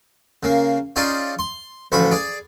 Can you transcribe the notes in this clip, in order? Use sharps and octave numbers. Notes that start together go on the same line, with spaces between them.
C#3 A#3
C#4 D#4 F4 G#4 D5
C6
A1 D2 F3 B5 C#6
G#4 D5